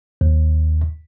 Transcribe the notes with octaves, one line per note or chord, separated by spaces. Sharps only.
D#2